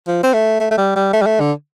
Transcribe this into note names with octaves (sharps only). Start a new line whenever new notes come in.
F3
C4
A3
A3
A3
G3
G3
A3
G3
A3
D3